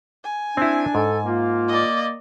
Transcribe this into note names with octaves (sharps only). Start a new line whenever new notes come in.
G#5
C4 D4 E4
G#2 A4
A#3 F4
D5 D#5